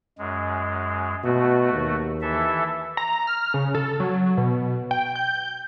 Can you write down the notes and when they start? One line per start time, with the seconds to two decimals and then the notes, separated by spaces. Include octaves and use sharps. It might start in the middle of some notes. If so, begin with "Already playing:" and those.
0.18 F#2 G#3
1.24 B2 A3 F#4
1.73 D#2
2.21 E3 A4 E5
2.97 A#5
3.27 F6
3.54 C#3
3.75 A4
4.00 F#3
4.37 B2
4.91 G5
5.15 G6